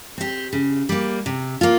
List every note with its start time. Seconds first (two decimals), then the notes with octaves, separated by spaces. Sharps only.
0.18 C4 G4
0.53 C#3
0.89 G3 A#3
1.26 C3
1.61 A#3 F4